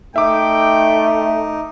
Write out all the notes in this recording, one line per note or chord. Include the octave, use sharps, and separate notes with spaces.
A3 D#4 E5 G5 D6